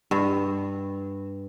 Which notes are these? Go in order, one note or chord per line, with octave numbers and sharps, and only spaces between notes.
G2